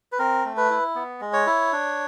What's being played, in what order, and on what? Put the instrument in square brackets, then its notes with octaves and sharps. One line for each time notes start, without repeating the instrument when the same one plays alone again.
[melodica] B4
C4 A#4
A3
B4
E4
B3
G#3
C#5
E4
D4